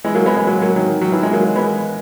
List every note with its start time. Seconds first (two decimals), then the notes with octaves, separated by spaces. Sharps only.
0.04 E3 G#3
0.15 F#3 A#3
0.26 G#3 B3
0.37 G#3 B3
0.47 F#3 A#3
0.61 F#3 A#3
0.76 D#3 F#3
1.01 D#3 F#3
1.12 E3
1.23 E3 G#3
1.33 F#3 A#3
1.55 G#3 B3